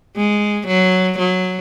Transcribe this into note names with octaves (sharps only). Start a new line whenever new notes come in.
G#3
F#3
F#3